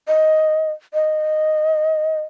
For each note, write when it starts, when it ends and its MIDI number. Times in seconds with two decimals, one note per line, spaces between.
0.08 0.71 75
0.93 2.20 75